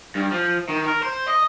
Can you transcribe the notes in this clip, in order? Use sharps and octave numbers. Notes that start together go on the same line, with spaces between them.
G2
F3
D#3
A#4
C5
D#5